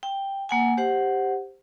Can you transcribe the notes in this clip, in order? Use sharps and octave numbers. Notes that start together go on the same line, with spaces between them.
G5
A#3 F#5 G#5
G4 C5 F#5